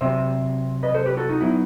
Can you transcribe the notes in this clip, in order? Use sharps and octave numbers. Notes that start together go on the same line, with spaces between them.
C3 F#3 C4 C5 E5
B4 D#5
A4 C5
G4 B4
F#4 A4
D#4 F#4
F#3 B3 D#4 E4